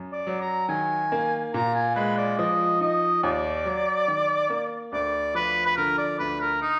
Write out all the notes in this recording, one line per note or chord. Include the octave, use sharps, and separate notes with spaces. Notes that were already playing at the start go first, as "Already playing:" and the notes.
Already playing: F#2
D5
F#3
A#5
D#3 G#5
A#3
A#2 A#5
G#5
G#3 B4
D5
F3 D#5
D#4 D#5
D#2 D5
F#3
D#3
A#3
D2 D5
F3 B4
B4
D3 A#4
D5
D2 B4
A#4
D#4